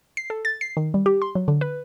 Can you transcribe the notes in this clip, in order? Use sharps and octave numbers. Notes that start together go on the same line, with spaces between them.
C7
A4
A6
C7
D#3
G3
G4
C6
F#3
D3
B4